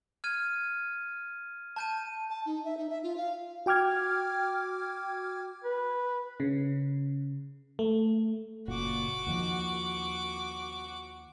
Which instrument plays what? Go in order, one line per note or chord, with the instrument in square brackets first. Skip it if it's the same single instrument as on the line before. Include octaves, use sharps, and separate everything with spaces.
[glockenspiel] F6 G#6 D#7
A5 G6 D#7
[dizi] A5
D#4
E5
D#4
E5
F4
F5
[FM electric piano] F#4 G5 D6 F6 G#6
[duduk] B4
[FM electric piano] C#3
A3
[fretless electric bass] F#1 A#2 [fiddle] F#4 D6
[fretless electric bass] D#2 D#3 F3